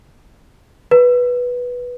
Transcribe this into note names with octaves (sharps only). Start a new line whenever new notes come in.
B4